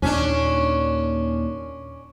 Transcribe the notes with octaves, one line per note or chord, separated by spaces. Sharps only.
D#2 A#2 C#4 D4